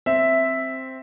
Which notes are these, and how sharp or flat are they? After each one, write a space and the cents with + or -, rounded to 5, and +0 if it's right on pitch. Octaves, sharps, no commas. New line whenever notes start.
C4 +0 E5 +0